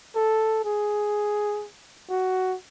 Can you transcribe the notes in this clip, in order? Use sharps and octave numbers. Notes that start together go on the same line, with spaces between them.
A4
G#4
F#4